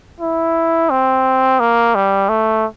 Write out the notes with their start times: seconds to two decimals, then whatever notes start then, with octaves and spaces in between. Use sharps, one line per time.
0.20 E4
0.90 C4
1.60 A#3
1.95 G3
2.29 A3